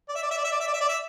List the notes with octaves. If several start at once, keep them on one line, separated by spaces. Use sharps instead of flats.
D5
E5
D5
E5
D5
E5
D5
E5
D5
E5
D5
E5